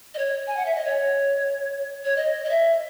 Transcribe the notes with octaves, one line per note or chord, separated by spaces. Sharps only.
D#5
C#5
G#5
F#5
E5
D#5
C#5
C#5
D#5
D#5
E5